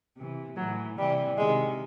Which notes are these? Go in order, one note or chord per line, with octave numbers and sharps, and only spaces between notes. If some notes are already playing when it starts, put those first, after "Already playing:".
C3 E3
A2 E3 F#3
C3 E3 G3
C3 D#3 G#3